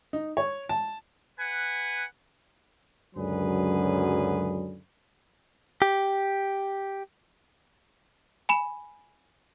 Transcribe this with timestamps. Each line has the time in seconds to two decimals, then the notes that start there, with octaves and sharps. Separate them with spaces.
0.13 D#4
0.37 C#5
0.69 A5
1.40 B4 F#5 G#5
3.15 C#2 F#2 D3 F#3 G#4 B4
5.82 G4
8.49 G#5 B5 E7